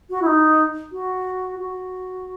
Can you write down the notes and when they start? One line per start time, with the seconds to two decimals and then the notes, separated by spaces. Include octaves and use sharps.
0.10 F#4
0.22 E4
0.26 D#4
0.92 F#4
1.59 F#4